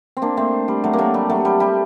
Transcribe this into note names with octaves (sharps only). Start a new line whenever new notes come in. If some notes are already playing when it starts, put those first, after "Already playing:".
C4
A#3 D4
A3 C4
G3
F#3 A3
A#3
F#3 A3
G3
F#3 A3
G3
G3